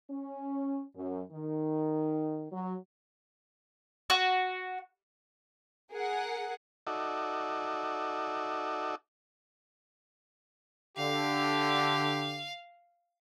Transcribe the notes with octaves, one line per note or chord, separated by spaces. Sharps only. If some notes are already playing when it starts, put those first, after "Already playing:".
C#4
F#2
D#3
F#3
F#4
G#4 A#4 F#5
D#4 F#4 A4 D5 E5
D3 G4 F5